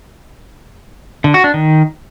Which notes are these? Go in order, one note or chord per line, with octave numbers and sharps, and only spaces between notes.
D3
F#4
D4
D#3